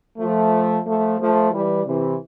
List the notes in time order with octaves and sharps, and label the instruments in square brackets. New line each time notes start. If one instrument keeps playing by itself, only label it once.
[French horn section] F3 A3
F3 A3
F3 A3
E3 G3
C3 E3